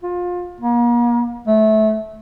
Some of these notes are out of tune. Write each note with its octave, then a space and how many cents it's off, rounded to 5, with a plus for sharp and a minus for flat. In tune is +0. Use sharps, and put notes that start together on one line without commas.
F4 +25
A#3 +40
A3 -20